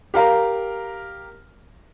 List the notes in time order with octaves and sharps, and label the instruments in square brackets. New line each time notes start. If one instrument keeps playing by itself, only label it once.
[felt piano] G4 A#4 F5 A#5